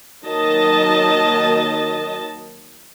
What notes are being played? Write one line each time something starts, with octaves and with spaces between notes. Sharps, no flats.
D#3 F#3 A#3 D#5 A5